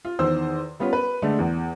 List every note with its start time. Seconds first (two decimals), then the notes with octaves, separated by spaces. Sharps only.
0.05 F4
0.19 E2 D#3 C5 E6
0.80 G3 B3 C#4 F4
0.93 B4
1.22 D3 G#3 A3 D4
1.39 E2